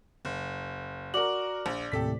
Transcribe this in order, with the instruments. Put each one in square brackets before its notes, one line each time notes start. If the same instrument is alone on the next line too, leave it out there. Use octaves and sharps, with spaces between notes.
[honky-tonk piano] F#1
[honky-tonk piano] F#4 A#4 [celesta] D5 D6 F#7
[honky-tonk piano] A#1
[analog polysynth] D#2 A2 C3 [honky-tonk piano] G4 A4 B6